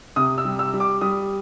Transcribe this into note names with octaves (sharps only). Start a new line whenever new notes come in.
C3 D#6
E6
G3
E6
G3
D6
G3 D#6